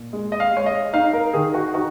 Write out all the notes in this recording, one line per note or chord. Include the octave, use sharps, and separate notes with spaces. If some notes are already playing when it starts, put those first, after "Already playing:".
Already playing: A#2
G#3
D#5
F5
G#3 C#5
D#5
D#4 F5
A#4
D#3 G#4
F#4
D#4 F#4